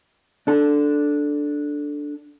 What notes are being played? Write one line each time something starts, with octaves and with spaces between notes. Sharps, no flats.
D4 A4